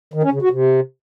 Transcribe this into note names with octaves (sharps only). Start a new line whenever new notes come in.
D#3
C#4
C#3
F#4
C3